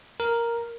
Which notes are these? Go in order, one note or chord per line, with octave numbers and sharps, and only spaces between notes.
A#4